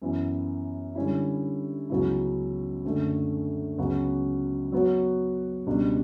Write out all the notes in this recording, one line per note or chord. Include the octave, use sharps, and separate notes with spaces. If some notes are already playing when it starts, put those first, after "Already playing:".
F#2 E3 B3
D3 G3 C#4 E4
C#2 C#3 F#3 B3 E4
F#2 D3 A3
C#2 C#3 F#3 B3 F#4
F#3 B3 F#4 C#5
C#2 B2 G3 D4